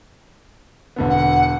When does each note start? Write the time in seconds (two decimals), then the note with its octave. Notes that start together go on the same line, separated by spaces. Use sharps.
0.96 E1 D3 B3
1.10 F#5